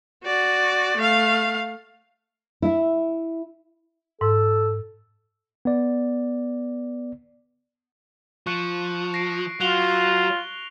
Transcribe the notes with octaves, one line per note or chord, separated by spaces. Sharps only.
F#4 D5
A3 F5
E4 E5
G#2 A4
B3 D5
F3 C#6 F#6 C#7
A#6 C7 D7
F#3 F4 F#6 F7 G7